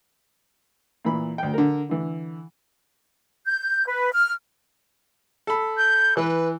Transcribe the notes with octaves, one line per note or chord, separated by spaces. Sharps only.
A#2 E3 B5
D2 G5
D3 A#4
D3 E3
G6
B4
F6
A4 B5
G6
E3 B4